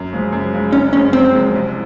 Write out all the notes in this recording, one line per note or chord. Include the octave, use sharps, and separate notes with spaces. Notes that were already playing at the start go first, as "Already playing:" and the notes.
Already playing: F#2
C#3 F3 G#3
F#2
C#3 F3 G#3
F#1 C#4
F#2 F3 G#3 C#4
F#1 C4
F#2 F3 G#3
C2